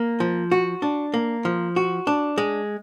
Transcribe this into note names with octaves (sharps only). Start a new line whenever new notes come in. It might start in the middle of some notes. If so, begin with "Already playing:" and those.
Already playing: A#3
F3
F#4
D4
A#3
F3
F#4
D4
G#3